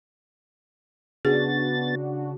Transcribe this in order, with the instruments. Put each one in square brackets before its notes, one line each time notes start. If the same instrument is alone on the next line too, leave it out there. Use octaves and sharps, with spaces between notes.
[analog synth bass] C#3 [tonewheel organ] B3 A6 [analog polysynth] D4 F#4 [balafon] G#4